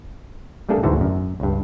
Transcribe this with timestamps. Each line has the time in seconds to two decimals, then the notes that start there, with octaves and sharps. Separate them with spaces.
0.69 G3 A3 A#3 D4 G#4 A4
0.83 D2 G#2 D3 E3 F#4 A5
1.01 F#2
1.40 C#2 G2